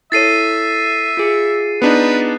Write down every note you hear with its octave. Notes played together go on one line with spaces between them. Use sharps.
E4 A4 C#5 E5 A6 C7 D#7
F4 G#4 C#7
B3 D4 D#4 B4